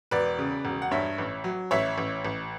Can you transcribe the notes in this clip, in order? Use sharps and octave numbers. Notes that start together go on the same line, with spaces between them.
E1 B4 D5
C#3
E1
F#5
G2 C#5 E5
A1
F#3
A1 C#5 E5
A1
A1